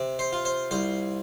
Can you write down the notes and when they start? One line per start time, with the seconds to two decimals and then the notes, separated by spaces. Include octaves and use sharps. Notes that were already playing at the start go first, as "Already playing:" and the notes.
Already playing: C3
0.19 C5
0.33 F4
0.45 C5
0.71 C2 C5